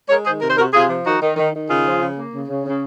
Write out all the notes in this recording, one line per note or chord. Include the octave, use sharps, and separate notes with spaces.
G#3 A#4 C#5
D#3 G#4 C5
C3 A#4
C5
C3 F#4 A#4
C3 F4 G#4
F3
D#3 D#4 F#4
D#3
D#3
D#3
C#3 F4 G#4
F3
C#3
A#3
C#3
C#3
C#3